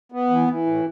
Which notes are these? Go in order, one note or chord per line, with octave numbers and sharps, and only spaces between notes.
B3
E3
E3
A2